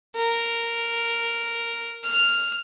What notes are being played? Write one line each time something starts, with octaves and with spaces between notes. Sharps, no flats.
A#4
F6